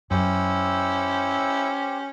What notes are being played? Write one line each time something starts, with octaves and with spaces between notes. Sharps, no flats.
F#2 C#4 E4 G4 C5 E6